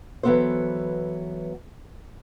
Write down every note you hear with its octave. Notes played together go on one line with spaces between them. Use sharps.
E3 F#3 G#3 B3 A4 C5